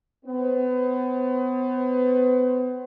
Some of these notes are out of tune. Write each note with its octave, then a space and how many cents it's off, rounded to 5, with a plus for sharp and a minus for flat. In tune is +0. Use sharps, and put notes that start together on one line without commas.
B3 +35 C5 +30